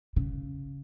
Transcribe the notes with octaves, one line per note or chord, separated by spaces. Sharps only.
C#3